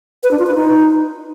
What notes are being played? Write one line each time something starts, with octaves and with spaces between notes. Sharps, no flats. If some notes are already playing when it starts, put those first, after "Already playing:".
B4
D4
F4
B4
D#4